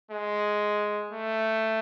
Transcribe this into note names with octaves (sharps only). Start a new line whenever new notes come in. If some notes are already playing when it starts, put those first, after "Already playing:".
G#3
A3